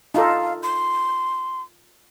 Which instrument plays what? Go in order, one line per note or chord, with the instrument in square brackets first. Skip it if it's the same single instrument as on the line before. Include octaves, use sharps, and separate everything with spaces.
[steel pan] D#4 F4 A4 [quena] F5
[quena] C6